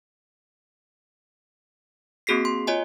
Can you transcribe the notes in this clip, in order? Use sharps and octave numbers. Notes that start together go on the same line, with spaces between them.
A#3 C4 F#4 G#4 B6 C7
C6
F4 C#5 D#5 G#5